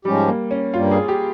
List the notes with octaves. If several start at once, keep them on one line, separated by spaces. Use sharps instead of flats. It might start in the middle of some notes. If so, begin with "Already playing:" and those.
G#2 F3 G3 G#3 C#4 G4
A#3
C#4
G2 G3 A#3 F4
G#4
G4